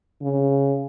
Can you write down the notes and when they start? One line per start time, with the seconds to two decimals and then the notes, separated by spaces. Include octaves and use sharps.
0.22 C#3